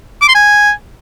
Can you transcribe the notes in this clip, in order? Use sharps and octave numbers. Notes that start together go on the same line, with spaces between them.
D6
C6
G#5